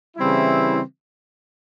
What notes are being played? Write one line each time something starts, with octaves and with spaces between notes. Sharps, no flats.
C#3 E3 G3 C4 E4